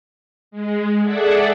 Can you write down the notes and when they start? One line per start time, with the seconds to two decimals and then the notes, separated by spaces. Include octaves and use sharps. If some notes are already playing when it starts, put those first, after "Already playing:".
0.51 G#3
1.03 G#4 A4 D5 E5 F#5